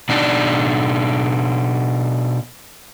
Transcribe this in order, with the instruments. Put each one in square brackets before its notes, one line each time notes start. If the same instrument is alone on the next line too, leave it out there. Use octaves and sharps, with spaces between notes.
[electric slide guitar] B2 D4 D#4 D5